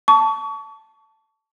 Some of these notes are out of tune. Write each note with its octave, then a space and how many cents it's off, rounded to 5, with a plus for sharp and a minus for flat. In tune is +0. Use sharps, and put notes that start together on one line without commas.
A5 +0 C#6 +35